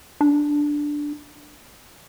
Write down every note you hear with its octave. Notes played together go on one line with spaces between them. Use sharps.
D4